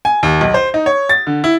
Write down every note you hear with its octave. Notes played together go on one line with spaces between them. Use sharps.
G#5
D#2
B1
C5
D#4
C#5
A6
D3
E4